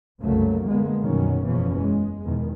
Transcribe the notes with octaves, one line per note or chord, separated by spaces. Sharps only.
C2 F#2 C#3 F#3 A3 A#3
D3 G#3 A#3 B3
C2 F#2 B2 D#3 F#3 C#4
F#1 E2 B2 E3 F3 C#4
G#3
E2 B2 D#3